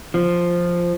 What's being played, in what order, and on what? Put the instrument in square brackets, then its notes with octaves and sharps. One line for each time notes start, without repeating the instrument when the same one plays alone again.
[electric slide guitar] F3